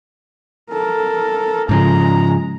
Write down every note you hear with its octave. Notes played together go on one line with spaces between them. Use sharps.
A4 A#4
G#2 C#3 F3 G#3 A#5